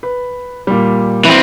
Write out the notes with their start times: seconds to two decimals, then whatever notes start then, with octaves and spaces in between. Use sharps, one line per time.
0.03 B4
0.67 A#2 G3
1.25 E3 C4